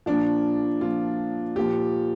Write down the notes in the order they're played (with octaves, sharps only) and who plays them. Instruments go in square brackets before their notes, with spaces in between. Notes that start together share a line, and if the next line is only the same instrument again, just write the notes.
[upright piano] A#2 F3 D4
A#2 F3 F4
A#2 F3 G4